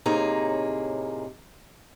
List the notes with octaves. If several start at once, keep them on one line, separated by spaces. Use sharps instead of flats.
A2 C3 A#3 D#4 G#4 C#5